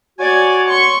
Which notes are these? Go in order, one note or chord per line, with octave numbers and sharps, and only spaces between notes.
F#4 C#5 D5 G#5
C6 C#6